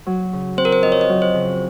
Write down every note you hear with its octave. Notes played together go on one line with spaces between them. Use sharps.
F#3
C#3
C4 C5
A#4
C5
F2 D#5
C#5
D#5
F#3
C5
C#3